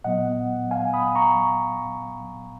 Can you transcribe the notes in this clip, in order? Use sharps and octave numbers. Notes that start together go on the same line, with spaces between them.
A#2 F#3 B3 D#5 F#5
F5 G#5
B5 D#6
A#5 C#6